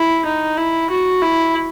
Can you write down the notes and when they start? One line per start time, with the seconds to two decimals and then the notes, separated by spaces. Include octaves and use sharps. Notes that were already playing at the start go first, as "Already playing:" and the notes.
Already playing: E4
0.25 D#4
0.57 E4
0.90 F#4
1.21 E4